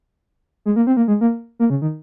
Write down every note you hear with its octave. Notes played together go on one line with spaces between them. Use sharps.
G#3
A#3
C4
A#3
G#3
A#3
A#3
C#3
D#3